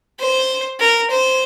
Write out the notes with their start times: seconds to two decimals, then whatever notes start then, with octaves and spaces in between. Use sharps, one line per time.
0.19 C5
0.80 A#4
1.10 C5